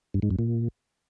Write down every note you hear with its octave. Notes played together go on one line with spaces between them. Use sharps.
G2
G#2
F#2
A#2